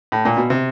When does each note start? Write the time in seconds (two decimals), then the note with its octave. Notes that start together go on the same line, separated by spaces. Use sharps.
0.12 A2
0.25 A#2
0.37 B2
0.50 C3